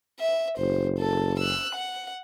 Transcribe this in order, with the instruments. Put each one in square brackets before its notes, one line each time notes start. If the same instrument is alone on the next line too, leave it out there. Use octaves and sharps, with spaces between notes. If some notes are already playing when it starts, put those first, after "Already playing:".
[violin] E5
[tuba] F#1 [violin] C5
[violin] A4
E6 F#6
F#5